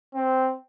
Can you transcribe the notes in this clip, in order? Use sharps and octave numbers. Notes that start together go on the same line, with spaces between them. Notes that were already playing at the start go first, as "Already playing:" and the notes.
C4